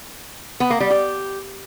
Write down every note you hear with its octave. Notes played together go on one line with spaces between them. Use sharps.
B3
A#3
G3
G4